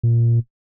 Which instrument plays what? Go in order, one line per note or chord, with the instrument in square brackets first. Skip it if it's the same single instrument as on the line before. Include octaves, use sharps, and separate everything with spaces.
[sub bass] A#2